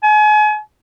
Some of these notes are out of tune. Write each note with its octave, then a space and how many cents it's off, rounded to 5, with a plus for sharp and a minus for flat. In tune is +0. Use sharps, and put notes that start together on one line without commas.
G#5 +35